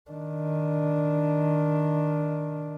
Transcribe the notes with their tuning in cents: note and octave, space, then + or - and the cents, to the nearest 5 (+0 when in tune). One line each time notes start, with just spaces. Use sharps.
D#3 +0 D4 +0